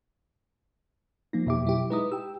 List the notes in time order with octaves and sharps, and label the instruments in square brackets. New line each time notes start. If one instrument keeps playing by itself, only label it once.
[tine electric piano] F3 A#3 D#4 [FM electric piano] A#6
[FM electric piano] F2 G4 [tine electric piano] B2 E5 D6
[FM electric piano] F#3 E4 G4
[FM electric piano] G#3 D#4 E4 [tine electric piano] B4 A#5 D#6
[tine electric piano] G4 G5 [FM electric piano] E6